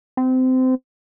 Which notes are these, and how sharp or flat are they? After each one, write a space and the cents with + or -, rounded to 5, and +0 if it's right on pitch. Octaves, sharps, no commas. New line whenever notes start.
C4 -25